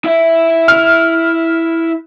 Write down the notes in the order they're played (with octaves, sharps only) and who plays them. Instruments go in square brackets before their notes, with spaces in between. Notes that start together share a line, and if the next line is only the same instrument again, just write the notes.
[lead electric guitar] E4 E5
[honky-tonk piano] F6